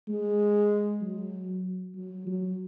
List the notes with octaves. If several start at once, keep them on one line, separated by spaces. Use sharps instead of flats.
G#3
F#3
F#3
F#3